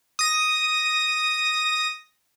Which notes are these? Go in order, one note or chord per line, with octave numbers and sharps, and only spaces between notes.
D#6 A#6